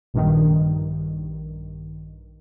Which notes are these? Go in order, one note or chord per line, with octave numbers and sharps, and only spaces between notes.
A#1 G2 D#3